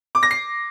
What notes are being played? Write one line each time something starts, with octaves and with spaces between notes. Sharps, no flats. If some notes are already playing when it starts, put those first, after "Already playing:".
D6
A#6
C7